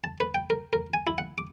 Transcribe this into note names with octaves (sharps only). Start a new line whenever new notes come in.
A5
B4
G5
A#4
A#4
G#5
E4
F#5
D6